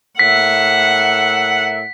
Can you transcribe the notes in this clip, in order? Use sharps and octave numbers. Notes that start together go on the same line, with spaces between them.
A2 A#4 E5 F#5 B6